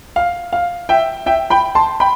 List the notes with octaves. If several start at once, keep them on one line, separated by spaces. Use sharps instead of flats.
F5
F5
E5 G5
E5 G5
G5 B5
A5 C6
G5 B5